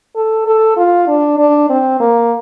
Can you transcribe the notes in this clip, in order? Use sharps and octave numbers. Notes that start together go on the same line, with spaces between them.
A4
A4
F4
D4
D4
C4
A#3